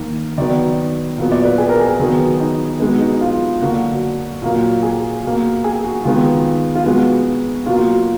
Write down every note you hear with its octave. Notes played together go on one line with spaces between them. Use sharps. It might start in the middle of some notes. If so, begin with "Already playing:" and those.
Already playing: D#3 A#3
D#3 F#3 B3 D5
A#2 F#3 B3
D5
B4
G#4
A#4
G#4
D#3 F#3 B3 G#4
D#4
B2 G#3 B3 D#4
D#4
F4
D3 F#3 A#3 F#4
A#2 F#3 A#3
G#4
B2 A#3
G#4
F#4
D#3 G#3 B3 F4
F4
B2 G#3 B3 F#4
B2 F#3 A#3 F4